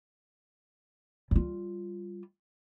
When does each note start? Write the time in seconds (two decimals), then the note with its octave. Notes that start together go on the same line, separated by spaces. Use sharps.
1.31 G3 F4